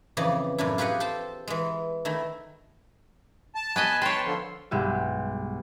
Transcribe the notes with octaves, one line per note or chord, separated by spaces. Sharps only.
F2 C#3 E3 D5 D#5
F#2 A2 D4 E4
F4 G4 G#4 B4 D#5 F#5
A4 C5 G5 A5
E3 G#3
D#3 A3 E4
A5
B3 B4 D#5 G#5
B4 C#5 G5 A5 C6
D3 F3
B1 G2 G#3 G4 E5